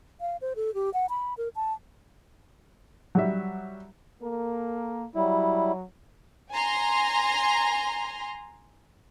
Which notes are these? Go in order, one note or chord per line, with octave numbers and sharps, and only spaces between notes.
F5
C5
A4
G4
F#5
B5
A#4
A5
F#3 G3 E5
A#3 A4 A#4
F#3 G3 E4
G#5 A#5 C6